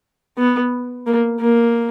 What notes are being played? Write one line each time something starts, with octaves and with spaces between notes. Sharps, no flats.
B3
A#3
A#3